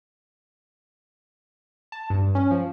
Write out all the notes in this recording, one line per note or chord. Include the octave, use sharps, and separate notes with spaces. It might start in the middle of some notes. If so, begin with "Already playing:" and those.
A5
G2
C#4
F3